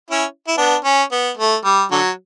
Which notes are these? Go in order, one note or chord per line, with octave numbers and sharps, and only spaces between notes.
C#4 E4
E4
B3 D4
C#4
B3
A3
G3
D3 F#3